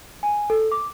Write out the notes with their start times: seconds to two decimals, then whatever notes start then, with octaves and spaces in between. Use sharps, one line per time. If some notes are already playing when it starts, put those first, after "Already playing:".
0.23 G#5
0.50 A4
0.72 D6